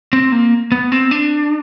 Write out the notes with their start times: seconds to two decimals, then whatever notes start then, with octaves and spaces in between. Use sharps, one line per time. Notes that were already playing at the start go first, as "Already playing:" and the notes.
0.13 C4
0.32 A#3
0.72 B3
0.92 C4
1.11 D4